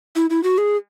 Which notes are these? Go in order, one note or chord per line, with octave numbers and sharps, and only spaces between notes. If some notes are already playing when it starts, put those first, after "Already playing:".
E4
E4
F#4
G#4